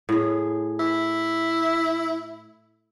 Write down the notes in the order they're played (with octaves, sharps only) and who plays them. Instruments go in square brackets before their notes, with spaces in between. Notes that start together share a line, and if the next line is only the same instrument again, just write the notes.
[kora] A2 G#4
[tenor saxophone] E4